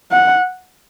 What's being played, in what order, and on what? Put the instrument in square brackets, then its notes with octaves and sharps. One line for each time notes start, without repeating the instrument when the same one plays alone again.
[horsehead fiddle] F#5